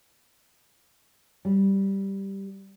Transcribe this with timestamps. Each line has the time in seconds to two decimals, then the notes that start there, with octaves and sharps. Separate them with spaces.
1.45 G3